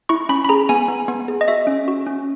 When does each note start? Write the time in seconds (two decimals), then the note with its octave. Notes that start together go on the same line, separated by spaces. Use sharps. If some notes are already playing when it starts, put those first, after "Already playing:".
0.09 E4 C#6
0.29 C#4 B5
0.45 B5
0.49 G#4 A#5
0.69 B3 G#5
0.88 B3
1.08 B3
1.28 G#4
1.41 D#5
1.48 F#4 E5
1.67 C#4
1.88 F#4
2.07 C#4